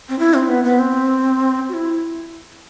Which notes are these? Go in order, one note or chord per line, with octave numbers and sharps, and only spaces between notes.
C4
E4
C4
B3
B3
C4
F#4
E4